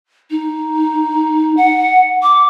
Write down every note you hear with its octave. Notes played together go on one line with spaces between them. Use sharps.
D#4
F#5
D6